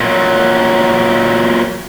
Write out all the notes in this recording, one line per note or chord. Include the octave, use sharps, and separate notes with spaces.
A#2 F#3